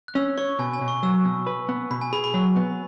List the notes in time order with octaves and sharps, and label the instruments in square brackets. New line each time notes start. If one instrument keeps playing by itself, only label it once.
[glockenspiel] F#6
[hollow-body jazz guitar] C#4 [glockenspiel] E6
[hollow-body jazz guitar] C#5 [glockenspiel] C#6
[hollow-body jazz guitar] B2 [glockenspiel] G#5
[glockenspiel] G#5
[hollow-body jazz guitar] B2
[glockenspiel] C#6
[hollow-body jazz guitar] F#3 [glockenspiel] E6
[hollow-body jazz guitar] B2
B4
B3
[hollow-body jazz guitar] B2 [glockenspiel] B5
[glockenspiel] G#5
[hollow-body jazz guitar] G#4 [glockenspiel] B5
[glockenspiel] B5
[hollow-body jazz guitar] F#3
B3